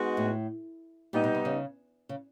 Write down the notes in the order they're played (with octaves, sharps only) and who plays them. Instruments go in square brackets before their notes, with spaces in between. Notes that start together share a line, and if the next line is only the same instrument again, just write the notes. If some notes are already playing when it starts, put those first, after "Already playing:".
Already playing: [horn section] G#3 B3 D#4 F#4
[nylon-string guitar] A2
[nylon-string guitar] A#2 [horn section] G3 B3 D#4
[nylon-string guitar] B2
C3
C#3
C#3